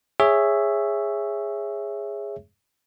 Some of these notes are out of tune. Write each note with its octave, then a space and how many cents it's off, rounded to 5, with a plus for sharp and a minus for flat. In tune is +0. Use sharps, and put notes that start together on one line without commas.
G#4 -10 C#5 +0 E5 +5